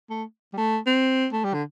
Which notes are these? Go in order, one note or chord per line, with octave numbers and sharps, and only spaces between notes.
A3
G3
A3
C4
A3
G3
D3